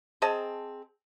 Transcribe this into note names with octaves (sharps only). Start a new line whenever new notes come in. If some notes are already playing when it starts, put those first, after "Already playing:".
C4 G#4 D#5 A5